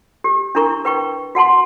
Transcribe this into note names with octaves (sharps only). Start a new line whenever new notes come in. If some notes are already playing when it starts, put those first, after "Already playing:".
G4
D4 E4 A#4 A#5 C#6
B4 G5 C#6
F#4 F#5 A5 C6